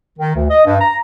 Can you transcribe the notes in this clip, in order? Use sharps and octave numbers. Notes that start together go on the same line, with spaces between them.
D#3
D2
D#5
G2
A#5